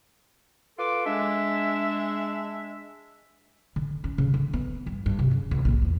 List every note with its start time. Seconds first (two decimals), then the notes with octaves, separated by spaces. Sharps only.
0.79 F4 A4 B4 C6 D6
1.06 G#3 D4 E5
3.76 D3
4.04 C#4
4.18 C#3
4.34 D3
4.53 B3
4.86 G2
5.06 G2
5.19 C3
5.31 C#3
5.51 C#2
5.65 A#1
5.82 E2